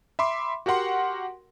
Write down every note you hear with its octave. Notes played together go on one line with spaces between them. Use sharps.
E5 B5 C6 D6
F#4 G4 A#4 F#5 C6